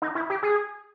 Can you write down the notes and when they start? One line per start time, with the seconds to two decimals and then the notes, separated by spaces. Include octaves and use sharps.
0.02 D#4
0.15 E4
0.30 G4
0.43 G#4